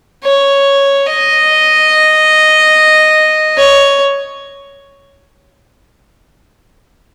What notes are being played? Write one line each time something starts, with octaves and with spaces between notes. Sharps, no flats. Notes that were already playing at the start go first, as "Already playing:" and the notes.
C#5
D#5
C#5